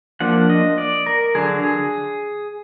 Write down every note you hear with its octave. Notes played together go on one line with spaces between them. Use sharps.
F3 A#3 D4 F#5
D#5
D5
A#4
D3 F#3 D4 G#4
G#4